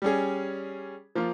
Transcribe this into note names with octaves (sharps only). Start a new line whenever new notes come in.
G3 C#4 G#4
F3 A#3 F4